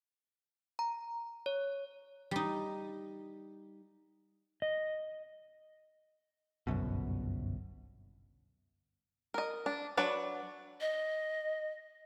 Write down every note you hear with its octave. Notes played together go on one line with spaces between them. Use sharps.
A#5
C#5
G3 D#4
D#5
G1 C2 F#2 B2
A#4 D#5
D4
F#3 D4 B4 D5
D#5